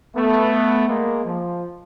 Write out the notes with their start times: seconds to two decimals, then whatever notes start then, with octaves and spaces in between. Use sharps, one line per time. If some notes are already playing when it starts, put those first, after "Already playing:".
0.15 A3 B3
0.88 G#3 A#3
1.24 F3